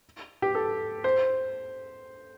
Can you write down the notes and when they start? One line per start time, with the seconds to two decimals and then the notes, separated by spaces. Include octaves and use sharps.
0.42 G4
0.55 A4
1.04 C5